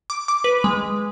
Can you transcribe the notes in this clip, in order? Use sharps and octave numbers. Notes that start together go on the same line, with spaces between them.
D6
D6
B4
G#3